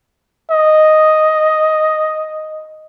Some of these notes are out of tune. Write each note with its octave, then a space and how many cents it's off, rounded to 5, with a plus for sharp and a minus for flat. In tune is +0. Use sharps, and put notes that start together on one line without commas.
D#5 +0